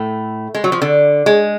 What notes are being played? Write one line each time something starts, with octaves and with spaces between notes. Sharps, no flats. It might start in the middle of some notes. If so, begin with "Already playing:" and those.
Already playing: A2 A3
G#3
F#3
F3
D3
G#3